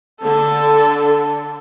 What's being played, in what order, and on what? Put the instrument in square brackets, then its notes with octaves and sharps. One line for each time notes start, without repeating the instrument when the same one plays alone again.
[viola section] D3 [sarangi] A4